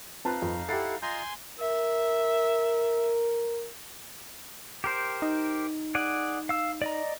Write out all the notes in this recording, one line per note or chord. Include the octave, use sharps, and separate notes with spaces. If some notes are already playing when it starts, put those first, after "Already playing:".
C4 D#4 F4 B4 F5 A5 F#6
F2
E4 G4 A4 F#5 A6 C7
F4 D#5 G#5 A#5 C6 G6
A#4 E5
G4 A#4 C5
D#4
G#4 D5 F#5
F5 E6
D5 D#5 A#5